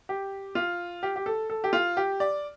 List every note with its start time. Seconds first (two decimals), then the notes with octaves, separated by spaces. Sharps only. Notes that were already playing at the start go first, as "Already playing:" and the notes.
0.09 G4
0.55 F4
1.03 G4
1.16 G4
1.26 A4
1.50 A4
1.64 G4
1.73 F4
1.97 G4
2.20 D5